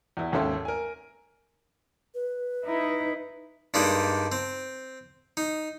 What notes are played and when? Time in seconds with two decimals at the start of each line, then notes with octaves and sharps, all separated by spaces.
0.17 E2 E4
0.32 G#1 D#2 C#4 A4 E5 C6
0.65 A#4 G#5
2.15 B4
2.65 D#4 E4
3.74 G2 G3 G#3 A#3 D4 D#4
4.32 C4
5.37 D#4